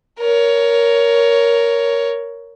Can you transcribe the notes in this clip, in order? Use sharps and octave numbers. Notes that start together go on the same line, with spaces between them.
A#4 C#5